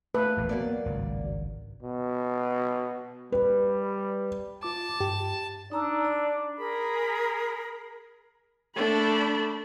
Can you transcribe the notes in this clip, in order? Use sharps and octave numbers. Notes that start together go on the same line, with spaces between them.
A3 B4 F5
E1 A1 D#2
F#3 A#3 B3 D5
G#1 C#2 G2
B2
G3 B4
F4 A5 D6
G2 G4
D4 D#4 A#5 E6
D5
G#4 A#4 B5
A3 D4 B5